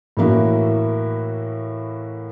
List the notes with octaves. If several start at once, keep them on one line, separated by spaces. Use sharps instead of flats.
A2 E3 A#3 E4 F#4